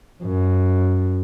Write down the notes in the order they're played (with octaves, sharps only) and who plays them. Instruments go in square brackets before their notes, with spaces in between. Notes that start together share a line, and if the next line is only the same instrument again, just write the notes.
[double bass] F#2